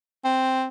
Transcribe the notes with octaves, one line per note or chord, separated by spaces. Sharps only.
C4